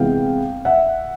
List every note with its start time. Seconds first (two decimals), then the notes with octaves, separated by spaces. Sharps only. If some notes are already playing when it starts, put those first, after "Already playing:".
Already playing: C3 E3 G#3 B3 F5 G5
0.65 E5 F#5